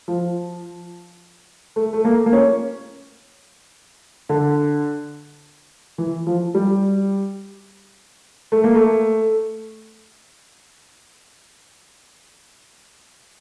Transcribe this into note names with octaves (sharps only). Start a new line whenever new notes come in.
F3
A3
A3
A#3
A#3
C#4
D3
E3
F3
G3
A3
A#3
A3